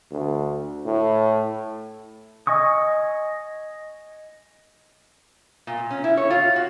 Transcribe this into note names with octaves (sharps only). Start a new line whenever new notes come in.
D2
A2
D#5 G#5 C#6 D#6
A#2
C#4
E4
C#5
F4
F#4